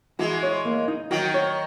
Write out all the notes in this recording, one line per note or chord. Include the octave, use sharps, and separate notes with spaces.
E3 G#3 F#4
C#5
A#3
D#4
D#3 F#3 F#4
C#5